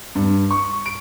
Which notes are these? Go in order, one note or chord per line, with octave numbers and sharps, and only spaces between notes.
G2
C#6
D7